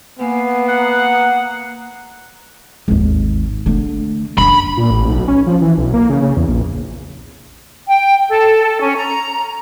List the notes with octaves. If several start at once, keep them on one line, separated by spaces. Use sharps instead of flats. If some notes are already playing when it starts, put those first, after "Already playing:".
A#3 B3 G#5
F#5 A#5 D#6 F#6
G#1 D#2
D3 A3
F#2 D3 B5
A#2
A1
B1
C#4
F3
E3
B1
A#3
C#3
C#3
E2
A#1
G5
A4
C#4
A#5